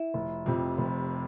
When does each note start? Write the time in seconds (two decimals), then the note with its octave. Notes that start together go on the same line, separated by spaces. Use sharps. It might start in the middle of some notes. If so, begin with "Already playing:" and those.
Already playing: E4
0.14 F1
0.46 F2 C3
0.78 F1